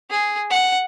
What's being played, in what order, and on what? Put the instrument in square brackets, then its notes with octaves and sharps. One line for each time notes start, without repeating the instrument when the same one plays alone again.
[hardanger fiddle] G#4
F#5